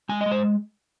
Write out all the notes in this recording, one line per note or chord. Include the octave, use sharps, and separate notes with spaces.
G#3 G#5
D#5
G#3
C5